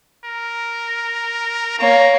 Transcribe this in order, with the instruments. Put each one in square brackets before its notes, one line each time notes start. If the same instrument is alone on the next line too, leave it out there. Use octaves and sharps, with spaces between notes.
[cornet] A#4
[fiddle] A#3 C#5 [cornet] A#5